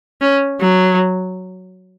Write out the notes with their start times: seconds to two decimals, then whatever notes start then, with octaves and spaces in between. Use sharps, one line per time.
0.21 C#4
0.60 F#3